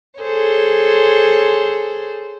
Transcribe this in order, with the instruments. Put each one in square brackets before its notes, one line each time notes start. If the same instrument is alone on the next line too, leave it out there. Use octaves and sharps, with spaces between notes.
[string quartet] G#4 A4 C5 C#5